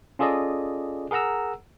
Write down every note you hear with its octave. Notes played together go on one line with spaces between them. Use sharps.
C#4 F4 G#4 A4 D5 D#5
G#4 A#4 F#5 A#5 E6